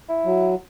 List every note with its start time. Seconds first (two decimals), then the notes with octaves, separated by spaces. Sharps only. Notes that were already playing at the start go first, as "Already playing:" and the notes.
0.09 E4
0.25 F#3